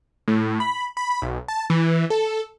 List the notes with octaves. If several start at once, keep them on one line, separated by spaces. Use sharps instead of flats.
A2
B5
B5
B1
A5
E3
A4